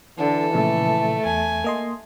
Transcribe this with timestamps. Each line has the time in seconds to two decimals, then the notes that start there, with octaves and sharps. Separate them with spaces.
0.19 D3 E3 A4
0.54 A#2 C#3 F3 A3
1.26 E2 G#5
1.64 A#3 D#5 C6